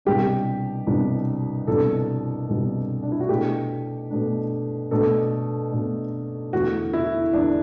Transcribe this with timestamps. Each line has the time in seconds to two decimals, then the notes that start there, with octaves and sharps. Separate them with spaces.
0.05 C2 B2 G3 D4 G4
0.87 C2 B2 G3 D4
1.67 C2 B2 G3 D4 A4
2.48 C2 B2 G3 D4
3.03 D4
3.12 E4
3.20 F#4
3.29 B2 A3 D4 G4
4.10 B2 A3 D4
4.91 B2 A3 D4 A4
5.72 B2 A3 D4
6.53 E2 D3 A3 E4 F#4
6.93 E4
7.33 E2 D3 A3 D4 E4